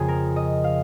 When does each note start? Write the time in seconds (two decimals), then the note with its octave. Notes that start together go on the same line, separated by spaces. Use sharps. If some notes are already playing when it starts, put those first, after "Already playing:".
Already playing: F2 C#3 A#3 G#4
0.08 A#4
0.36 D#5
0.64 F5